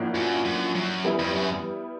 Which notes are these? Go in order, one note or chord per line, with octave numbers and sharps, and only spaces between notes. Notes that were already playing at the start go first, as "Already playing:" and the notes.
Already playing: A2 F3 A#3 D4 F#4
F#2
F#2
F#2
G3 B3 E4
F2
F#2